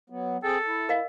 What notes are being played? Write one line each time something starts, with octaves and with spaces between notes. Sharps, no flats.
F#3 B3
C4 G#4 A4 G5
E4
A#4 D#5 F5